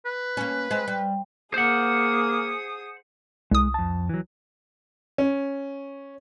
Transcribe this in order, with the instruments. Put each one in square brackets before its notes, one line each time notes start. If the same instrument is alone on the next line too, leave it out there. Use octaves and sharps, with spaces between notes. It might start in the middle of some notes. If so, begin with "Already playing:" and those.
[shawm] B4
[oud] A#3 C#4
G#3 C4
G3
[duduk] A#3 [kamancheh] G#4 D#6 [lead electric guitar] C5 F#5
[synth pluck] C2 D#6 [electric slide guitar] G#3
[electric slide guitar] F2 A5
E3 F#3
[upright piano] C#4